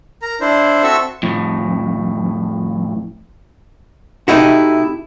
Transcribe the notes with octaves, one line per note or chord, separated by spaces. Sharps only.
A#4 A#5
D4 E4 C5
C4 F#4 A4 E5 C#6 E6
F2 A2
C3 A3 D#4 E4 F#4